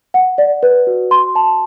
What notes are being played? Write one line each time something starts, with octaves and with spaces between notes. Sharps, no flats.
F#5
D5
B4
F#4
C6
A5